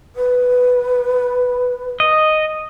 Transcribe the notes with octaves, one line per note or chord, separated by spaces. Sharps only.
B4
D#5